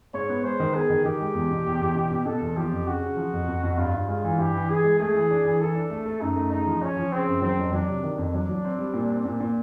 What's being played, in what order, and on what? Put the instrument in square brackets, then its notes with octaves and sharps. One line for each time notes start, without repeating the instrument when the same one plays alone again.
[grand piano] G#2 [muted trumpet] C#5
[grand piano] B3
[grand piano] G#3 [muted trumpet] C5
[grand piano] D#3
[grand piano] B3 [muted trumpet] G#4
[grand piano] D#3
[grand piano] D#3 [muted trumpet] G4
[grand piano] G#3
E2
B2
E2
E2
B2
B2
[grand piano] B2 [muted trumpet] A4
[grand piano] E2
[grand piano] F3 [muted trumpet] G4
[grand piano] F2
[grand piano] C#3 [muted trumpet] F#4
[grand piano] C#3
F3
F2
F2
F2
[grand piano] G2 [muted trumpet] F4
[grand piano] G2
[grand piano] G#3 [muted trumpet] F4
[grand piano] E3
[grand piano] G2 [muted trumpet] G4
[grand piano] E3
[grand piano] E3 [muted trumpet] G#4
[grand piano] G#3
[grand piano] A3 [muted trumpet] G#4
[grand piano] E3
D4
E3
[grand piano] E3 [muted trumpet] A4
[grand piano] D4
A3
A3
[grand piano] F#2 [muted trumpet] D#4
[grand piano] A3
[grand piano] C#3 [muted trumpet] D#4
[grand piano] F3
[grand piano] F3 [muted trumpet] C#4
[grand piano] F3
[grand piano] C#3 [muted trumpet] C4
[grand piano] F#2
[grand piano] F#3 [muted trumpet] C4
[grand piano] F2
[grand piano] F#3 [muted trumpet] D4
[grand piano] C3
D#3
F2
[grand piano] F#3 [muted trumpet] D4
[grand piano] F#3
C4
G3
A#2
C4
A#2
A#2